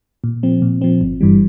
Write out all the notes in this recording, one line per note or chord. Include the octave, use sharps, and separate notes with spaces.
A#2
F3 C4
A#2
F3 C4
G1
G2 E3 G3